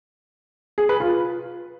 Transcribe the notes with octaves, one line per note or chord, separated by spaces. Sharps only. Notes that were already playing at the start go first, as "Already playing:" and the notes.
G#4
B4
F4